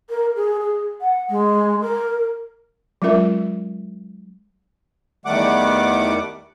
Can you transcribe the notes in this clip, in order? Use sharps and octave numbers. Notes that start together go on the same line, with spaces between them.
A#4
G#4
G#4
F#5
G#3
A#4
F#3 G#3 C#4 F4 A#4 E5
E2 D#3 G3 A3 F#5 D6